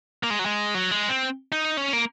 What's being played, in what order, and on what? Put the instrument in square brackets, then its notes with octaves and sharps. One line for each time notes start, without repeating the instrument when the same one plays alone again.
[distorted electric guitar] A#3
G#3
F#3
G#3
F#3
G#3
C4
D#4
C#4
A#3